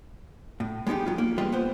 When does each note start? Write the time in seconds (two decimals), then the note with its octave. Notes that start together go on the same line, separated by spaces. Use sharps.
0.60 A2
0.87 G#3 B3 D4 D#4 G4
1.06 F#3 F4
1.18 A#3
1.38 G3 G#3 F4 B4 D#5
1.52 B3 C5